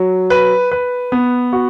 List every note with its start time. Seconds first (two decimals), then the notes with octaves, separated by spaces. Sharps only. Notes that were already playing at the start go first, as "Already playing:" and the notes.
Already playing: F#3
0.30 B4
0.71 B4
1.12 B3
1.53 F#4